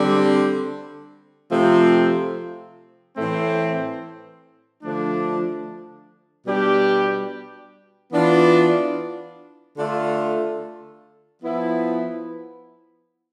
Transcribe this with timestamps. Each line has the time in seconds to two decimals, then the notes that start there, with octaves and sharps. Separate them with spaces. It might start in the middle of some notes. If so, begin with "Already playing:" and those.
Already playing: D3 G3 C4
1.52 C3 F3 A3 C4
3.17 A2 E3 A3 C4
4.82 D3 F3 A3 D4
6.47 B2 G3 D4 G4
8.12 E3 B3 D4 F4
9.77 D3 A3 D4 F4
11.42 F3 B3 E4